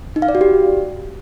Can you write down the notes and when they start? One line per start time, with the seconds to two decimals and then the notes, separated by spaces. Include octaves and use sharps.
0.16 D#4
0.22 F5
0.29 D5
0.35 F#4
0.41 G4